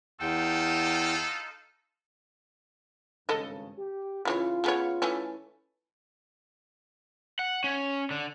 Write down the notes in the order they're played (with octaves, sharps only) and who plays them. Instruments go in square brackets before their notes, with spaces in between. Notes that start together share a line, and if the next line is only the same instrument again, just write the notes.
[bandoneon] E2 G5 [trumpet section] D#4 F4 A4
[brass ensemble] G#1 G2 C#3 [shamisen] A4 D#5
[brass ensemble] G4
[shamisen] C#3 E3 C#5 [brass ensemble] F4
[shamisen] C#3 B3 C#5
E3 A3 C#4
[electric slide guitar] F#5
C#4
D3